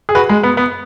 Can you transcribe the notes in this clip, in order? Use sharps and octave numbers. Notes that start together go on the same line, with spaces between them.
G#4
F#4 B4
G#3
B3
B3